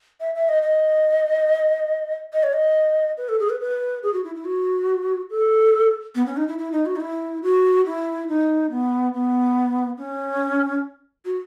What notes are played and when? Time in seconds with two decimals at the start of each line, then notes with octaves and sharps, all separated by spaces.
0.20 E5
0.35 E5
0.49 D#5
0.63 D#5
2.33 D#5
2.43 C#5
2.53 D#5
3.17 B4
3.29 A4
3.40 G#4
3.50 B4
3.60 B4
4.03 G#4
4.13 F#4
4.24 E4
4.35 E4
4.45 F#4
5.31 A4
6.15 B3
6.26 C#4
6.37 D#4
6.48 E4
6.58 E4
6.72 D#4
6.86 F#4
6.96 D#4
7.00 E4
7.43 F#4
7.86 E4
8.28 D#4
8.71 B3
9.13 B3
9.98 C#4
11.25 F#4